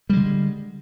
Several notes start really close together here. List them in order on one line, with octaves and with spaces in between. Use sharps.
G3 G#3 D3